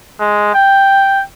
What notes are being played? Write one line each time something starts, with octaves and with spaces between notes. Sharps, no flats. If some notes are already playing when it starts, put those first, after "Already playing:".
G#3
G5